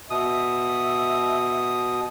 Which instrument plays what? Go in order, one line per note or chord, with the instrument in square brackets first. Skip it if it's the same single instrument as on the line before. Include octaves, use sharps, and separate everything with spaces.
[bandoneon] B2 D#6 [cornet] E5